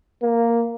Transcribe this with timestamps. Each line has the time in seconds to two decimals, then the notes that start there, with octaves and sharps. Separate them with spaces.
0.22 A#3